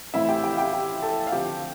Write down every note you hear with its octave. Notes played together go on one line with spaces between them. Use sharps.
A2 E3 A3 C4 E4 E5
G4 G5
G4 G5
F5
G4 G5
G4 G5
A4 A5
F5
D3 F3 C4 G4 G5